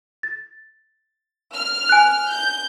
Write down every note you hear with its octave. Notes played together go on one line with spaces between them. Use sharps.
A6
F6
G#5 F#6
G6